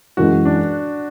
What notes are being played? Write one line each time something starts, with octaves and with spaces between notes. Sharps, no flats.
F#2 E3 G#3 F#4
D4